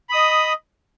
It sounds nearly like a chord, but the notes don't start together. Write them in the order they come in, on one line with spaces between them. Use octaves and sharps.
B5 D#6 D#5